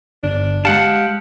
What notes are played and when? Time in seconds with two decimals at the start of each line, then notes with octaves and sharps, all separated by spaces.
0.24 G1 D4
0.65 G#3 G4 F5 F#5 A5 F#6